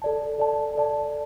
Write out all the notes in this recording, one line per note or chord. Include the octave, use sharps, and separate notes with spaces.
A4 D5 A5
A4 D5 A5
A4 D5 A5